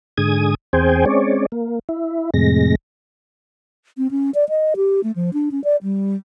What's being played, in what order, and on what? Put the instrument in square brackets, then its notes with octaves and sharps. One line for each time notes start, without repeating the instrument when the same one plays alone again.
[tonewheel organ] G#2 D3 G#4 D#6 G#6
E2 C4 G#4 C5 G5 G#5
G#3 C4 C#4 C#5 D5
A#3
E4
F2 A2 C3 G#3 A#6
[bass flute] C4
C#4
D5
D#5
G4
A3
F3
D4
C#4
D5
G3